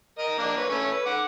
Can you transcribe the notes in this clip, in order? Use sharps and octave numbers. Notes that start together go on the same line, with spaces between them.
A#4 D#5
A#3 D4 A#4
B4 C#5
A3 C#4 C#5
B4
F#5 D6